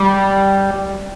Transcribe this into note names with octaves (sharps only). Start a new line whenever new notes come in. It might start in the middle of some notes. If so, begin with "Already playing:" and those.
Already playing: G3